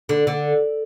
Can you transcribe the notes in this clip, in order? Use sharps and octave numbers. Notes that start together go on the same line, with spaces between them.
D3
D3